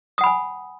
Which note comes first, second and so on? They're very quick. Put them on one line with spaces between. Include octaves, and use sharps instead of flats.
D#6 F#5 B5 G#5